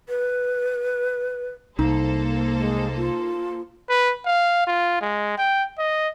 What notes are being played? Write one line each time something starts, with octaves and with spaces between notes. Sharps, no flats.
B4
C2 A#3 D#4 A4 C5
G#3
F4
B4
F5
F4
G#3
G5
D#5